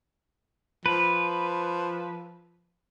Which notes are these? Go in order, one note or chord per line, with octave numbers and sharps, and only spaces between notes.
F3 B4